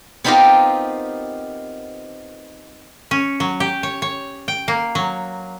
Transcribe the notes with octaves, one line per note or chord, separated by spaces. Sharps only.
B3 C4 D#4 F4 G4 A#4
C#4
F#3
G4
C#5
C#5
G5
A#3
F#3